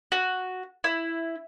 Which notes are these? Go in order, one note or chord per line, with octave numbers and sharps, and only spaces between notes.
F#4
E4